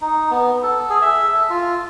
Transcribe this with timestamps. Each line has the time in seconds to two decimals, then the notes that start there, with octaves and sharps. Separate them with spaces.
0.02 D#4
0.31 B3
0.63 A4
0.90 G#4
1.02 E5
1.35 A4
1.50 F4